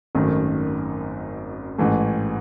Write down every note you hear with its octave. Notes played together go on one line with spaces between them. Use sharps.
G#1 F#2 D#3 A3
A1 G#2 E3 A3